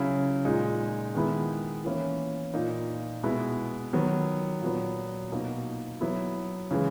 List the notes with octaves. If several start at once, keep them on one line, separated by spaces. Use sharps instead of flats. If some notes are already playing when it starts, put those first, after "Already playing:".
Already playing: C#3 F#3 C#4 E4
A#2 G#3 D#4
D#3 G#3 B3 E4
E3 A#3 C#4 E4
A#2 A#3 D#4
B2 G#3 B3 E4
D#3 F#3 B3
A#2 F#3 B3
B2 A#3 D#4
F#3 B3 E4
C#3 E3 G#3